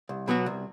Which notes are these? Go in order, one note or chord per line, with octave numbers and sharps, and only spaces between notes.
C2
B2 F#3 B3 F#4
C2